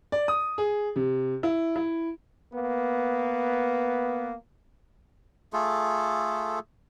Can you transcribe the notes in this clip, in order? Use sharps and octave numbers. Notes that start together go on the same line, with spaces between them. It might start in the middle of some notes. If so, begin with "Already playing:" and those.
D5
D#6
G#4
C3
E4
E4
A#3 B3
A3 F4 G#4 A4